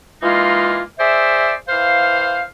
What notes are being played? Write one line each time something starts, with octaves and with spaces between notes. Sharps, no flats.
E3 G#3 A#3 D#4 F4
G#4 C5 D5 E5
E3 C5 F5